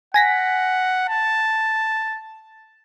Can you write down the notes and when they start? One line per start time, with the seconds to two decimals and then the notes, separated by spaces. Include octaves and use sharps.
0.14 F#5 G#5 A#6 B6
1.09 A5